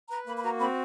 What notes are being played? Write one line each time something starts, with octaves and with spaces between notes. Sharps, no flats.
B4 A#5
A#3 B5
B5
F#4 A#5
C4 B5